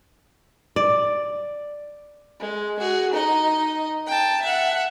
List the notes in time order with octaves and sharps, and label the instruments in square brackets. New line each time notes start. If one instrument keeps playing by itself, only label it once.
[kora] D5
[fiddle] G#3
F#4 G#4
D#4 D#5
G5 A5
E5 F#5